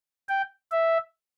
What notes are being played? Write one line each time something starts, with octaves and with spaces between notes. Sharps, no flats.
G5
E5